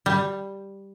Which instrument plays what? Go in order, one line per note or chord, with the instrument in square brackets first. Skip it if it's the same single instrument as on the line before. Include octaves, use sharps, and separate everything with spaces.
[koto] G3